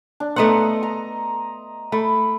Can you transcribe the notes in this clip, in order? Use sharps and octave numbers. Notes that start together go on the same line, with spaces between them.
D4
A3 B3 D#5 F#5 A#5 C6
A#5
A3 B5